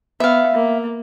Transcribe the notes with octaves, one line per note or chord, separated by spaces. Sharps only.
B3 E5 F5
A#3